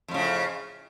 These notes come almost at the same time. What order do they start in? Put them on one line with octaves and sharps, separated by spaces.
F2 A2 C#3